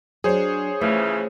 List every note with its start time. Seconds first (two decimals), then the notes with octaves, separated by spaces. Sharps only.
0.24 F#3 D4 G#4 C5 C#5
0.81 C#3 E3 F3 A3